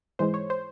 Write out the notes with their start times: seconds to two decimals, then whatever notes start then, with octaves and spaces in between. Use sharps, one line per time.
0.19 G#2 E3 G#3 C5
0.34 C#5
0.50 C5